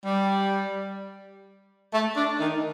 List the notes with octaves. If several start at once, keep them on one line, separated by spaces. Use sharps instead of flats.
G3
A3
D4
D#3